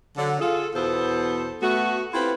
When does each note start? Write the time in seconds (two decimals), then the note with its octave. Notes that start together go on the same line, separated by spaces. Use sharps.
0.17 D3 F#3
0.40 F4 G#4 A4
0.75 E2 B2 B3 A4 C5
1.62 A3 B3 F#4
2.13 C4 E4 F4 G4 A4 B4